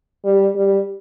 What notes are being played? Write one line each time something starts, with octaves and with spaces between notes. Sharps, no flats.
G3
G3